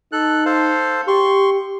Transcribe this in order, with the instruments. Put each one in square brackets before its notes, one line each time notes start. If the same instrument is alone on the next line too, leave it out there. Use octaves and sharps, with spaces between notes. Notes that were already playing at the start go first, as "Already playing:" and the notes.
[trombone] D#4 [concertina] A4 F#6
[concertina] A4 C5 F5
[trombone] G4 [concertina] C6 C#6